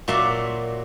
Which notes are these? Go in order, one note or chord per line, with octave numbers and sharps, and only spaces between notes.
A#2 F#3 D5 E5 F#5 C6